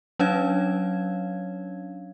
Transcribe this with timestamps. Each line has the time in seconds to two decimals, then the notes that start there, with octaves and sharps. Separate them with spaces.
0.19 F#3 C#4 D4 C#5 F5 G#6